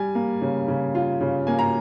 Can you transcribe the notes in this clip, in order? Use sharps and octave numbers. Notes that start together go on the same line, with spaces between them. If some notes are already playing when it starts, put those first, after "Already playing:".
Already playing: G3 G#5
A#3
C#3
C#3
F4
C#3
A#3 G#5
A#5